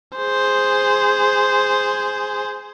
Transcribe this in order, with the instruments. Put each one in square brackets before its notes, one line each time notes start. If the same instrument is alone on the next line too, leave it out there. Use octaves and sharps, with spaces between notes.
[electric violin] G#4 C5